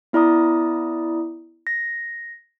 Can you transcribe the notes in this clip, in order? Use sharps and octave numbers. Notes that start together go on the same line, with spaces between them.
B3 E4 D5 A#5 D#6
A#6